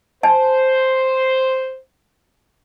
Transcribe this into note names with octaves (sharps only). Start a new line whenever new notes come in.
C5 G#5 A5